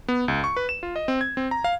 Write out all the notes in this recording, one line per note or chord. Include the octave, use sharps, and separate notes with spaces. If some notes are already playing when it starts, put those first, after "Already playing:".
B3
C#2
C#6
B4
E7
F4
D#5
C4
G#6
C4
A#5
F5